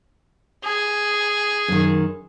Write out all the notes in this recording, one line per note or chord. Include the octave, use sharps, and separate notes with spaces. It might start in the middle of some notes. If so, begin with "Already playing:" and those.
G#4
F#2 D#3